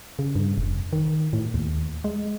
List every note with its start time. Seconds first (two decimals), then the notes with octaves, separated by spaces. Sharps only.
0.19 C#3
0.35 G2
0.58 F1
0.93 D#3
1.33 A2
1.54 D#2
2.04 G#3